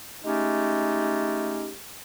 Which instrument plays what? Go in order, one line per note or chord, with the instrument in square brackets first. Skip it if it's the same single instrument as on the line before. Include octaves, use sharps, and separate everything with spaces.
[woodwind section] G#3 A3 C#4 D#4 G4